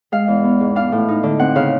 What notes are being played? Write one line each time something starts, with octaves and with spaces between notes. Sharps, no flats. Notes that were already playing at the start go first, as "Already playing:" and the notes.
G#3 F5
E2
B3
G#2
D4 F5
A2
D#4
D3
C4 F#5
C#3 F5